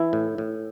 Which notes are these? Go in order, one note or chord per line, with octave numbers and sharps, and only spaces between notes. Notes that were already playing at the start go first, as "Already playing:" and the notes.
Already playing: E3 E4
A2
A2